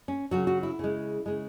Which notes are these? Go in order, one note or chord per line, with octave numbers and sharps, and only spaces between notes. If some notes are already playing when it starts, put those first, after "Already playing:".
C#4
C#3 F#3 F#4
F#4
E4
C#3 G#3
C#3 G#3